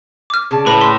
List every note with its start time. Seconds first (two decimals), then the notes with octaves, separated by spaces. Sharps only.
0.30 D6 F6
0.51 C#3 D5 A5
0.66 A2 B4 B5 F#7
0.81 C6 B6